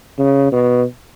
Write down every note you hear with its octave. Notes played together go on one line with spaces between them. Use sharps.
C#3
B2